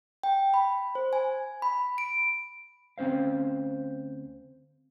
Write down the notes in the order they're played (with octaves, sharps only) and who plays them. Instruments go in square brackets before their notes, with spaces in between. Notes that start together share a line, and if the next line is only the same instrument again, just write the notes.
[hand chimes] G5
B5
C5
G#5
B5
D7
[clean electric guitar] D2 C4 C#4 C5 F5